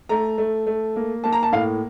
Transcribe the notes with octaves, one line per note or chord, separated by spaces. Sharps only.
A3 A#5
A3
A3
A#3
A#3 A5
A#5
A5
A2 F5